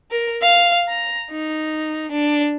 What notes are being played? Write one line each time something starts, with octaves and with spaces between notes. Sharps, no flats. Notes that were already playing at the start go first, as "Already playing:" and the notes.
A#4
F5
A#5
D#4
D4